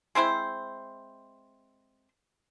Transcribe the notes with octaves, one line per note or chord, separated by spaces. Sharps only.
G#3 C4 E4 C5